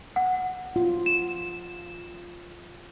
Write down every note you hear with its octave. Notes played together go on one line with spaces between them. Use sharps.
F#5
F4
E7